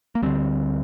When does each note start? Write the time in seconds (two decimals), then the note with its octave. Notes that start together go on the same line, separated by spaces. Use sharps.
0.15 A#3
0.22 D2 D3 G3 C4